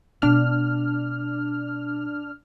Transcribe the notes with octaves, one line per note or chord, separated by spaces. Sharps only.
B2 D4 F6